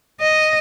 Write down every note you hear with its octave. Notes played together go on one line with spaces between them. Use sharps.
D#5